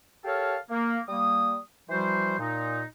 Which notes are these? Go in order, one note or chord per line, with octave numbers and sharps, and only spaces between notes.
G4 A4 A#4 C#5 F5 A5
A#3
G3 A#3 D#6
E3 F3 G3 F#4 C5
A#2 D#4